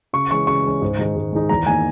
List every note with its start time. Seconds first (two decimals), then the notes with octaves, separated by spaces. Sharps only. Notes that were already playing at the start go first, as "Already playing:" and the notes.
0.13 C#3 C#6
0.31 E3 G#3 C#4 C#6
0.47 C#3 C#6
0.64 E3 G#3 C#4
0.82 G#2
0.99 D#3 G#3 D#4
1.16 G#2
1.33 D#3 G#3 D#4
1.49 E2 A#5
1.67 D#3 A#3 D#4 G#5